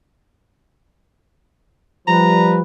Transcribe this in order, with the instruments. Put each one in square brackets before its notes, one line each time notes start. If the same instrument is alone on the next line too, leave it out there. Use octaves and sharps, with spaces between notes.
[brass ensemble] F3 G3 B4 [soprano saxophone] A#5